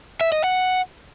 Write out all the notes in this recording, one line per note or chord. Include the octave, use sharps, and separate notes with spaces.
E5
D#5
F#5